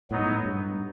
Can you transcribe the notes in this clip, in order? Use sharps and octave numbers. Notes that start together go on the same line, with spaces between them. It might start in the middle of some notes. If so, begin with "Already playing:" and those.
A2 F#3 B3 D#4
G#2
A2
G2